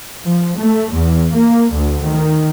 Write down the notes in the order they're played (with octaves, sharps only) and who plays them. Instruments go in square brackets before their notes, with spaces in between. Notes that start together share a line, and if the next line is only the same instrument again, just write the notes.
[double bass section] F3
A3
E2
A#3
D2
D#3